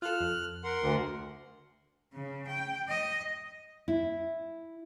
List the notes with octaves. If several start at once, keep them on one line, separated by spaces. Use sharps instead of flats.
F4 A4 F6 F#6
F2
A#4 F#5 C6
D2
C#3
G5
D#5
E4